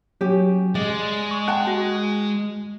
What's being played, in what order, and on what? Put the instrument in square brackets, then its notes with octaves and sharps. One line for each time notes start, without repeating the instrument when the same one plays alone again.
[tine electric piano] F#3 [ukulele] C#4 G4
[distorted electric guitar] G#3 [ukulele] D5 [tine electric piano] D#5
[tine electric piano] C#6
[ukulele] F#5 G5 A5 [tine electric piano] F#6
[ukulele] F#4